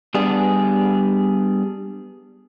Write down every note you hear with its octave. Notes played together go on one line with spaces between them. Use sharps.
G3 B3 D4 G#4